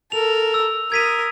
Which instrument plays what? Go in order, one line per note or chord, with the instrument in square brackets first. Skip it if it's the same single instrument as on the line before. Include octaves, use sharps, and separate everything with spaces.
[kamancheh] A4 A#4 [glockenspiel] F7
[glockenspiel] E6
[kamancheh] A#4 D#6 [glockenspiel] G#6 B6 D#7